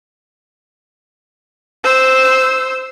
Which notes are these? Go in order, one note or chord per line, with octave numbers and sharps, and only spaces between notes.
C5 E6